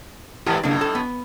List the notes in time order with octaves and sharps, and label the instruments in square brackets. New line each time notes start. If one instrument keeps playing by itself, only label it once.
[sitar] G#2 E3 D5 [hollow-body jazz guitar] E4 G4 A#4
[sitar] F#2 A2 [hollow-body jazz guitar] C#3 A#3 D4
[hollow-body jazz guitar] A4
B3